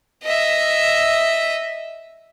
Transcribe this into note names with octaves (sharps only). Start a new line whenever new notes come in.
D#5 E5